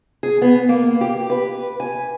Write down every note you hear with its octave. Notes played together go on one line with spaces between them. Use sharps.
G#4
B3
A#3
G4
B4
G#5